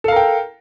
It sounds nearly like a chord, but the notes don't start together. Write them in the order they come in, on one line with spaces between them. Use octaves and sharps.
A4 F5 A#4 G5